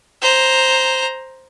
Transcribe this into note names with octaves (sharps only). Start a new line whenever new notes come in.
C5 A#5